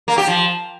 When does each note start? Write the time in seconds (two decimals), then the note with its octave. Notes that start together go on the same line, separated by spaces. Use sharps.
0.08 A#3
0.18 G4
0.27 F3